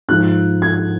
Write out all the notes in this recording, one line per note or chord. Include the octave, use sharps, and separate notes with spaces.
G#2 F3 F#6
G#6